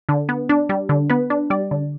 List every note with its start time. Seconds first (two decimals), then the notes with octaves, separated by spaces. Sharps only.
0.09 D3
0.29 B3
0.49 D4
0.69 G3
0.89 D3
1.10 B3 B4
1.30 D4
1.50 G3 D5
1.71 D3